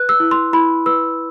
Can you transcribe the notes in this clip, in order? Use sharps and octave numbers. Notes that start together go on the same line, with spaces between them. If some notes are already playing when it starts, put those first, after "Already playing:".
Already playing: B4 F#6
E6
E4
C6
E4 B5
B4 E6